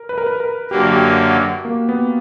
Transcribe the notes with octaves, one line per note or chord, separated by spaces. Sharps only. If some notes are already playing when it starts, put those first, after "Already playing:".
Already playing: A#4
B4
A#4
B4
A#4
F#2 D3 F#3 A#3 G4
F#4
G4
A#3
B3